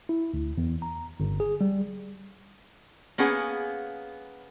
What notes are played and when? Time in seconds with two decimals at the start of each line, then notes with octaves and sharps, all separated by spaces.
0.09 E4
0.34 D2
0.58 E2
0.82 A#5
1.20 G1
1.40 G#4
1.61 G3
3.18 A#3 B3 C#4 G#4 F#5